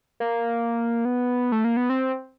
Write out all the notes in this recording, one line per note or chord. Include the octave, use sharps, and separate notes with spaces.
A#3
B3
A3
A#3
B3
C4